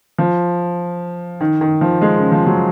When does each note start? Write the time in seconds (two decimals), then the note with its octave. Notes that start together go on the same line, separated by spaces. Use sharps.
0.18 F3
1.41 D#3
1.61 D#3
1.81 F3
2.02 G#3
2.17 C#3
2.32 F3
2.47 F#3